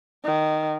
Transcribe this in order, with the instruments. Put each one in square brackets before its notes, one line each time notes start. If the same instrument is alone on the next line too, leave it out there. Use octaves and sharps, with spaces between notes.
[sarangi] D#3